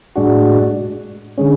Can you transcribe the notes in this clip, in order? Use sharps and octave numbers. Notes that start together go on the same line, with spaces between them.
A2 G#3 D4 F#4
D3 G#3 C#4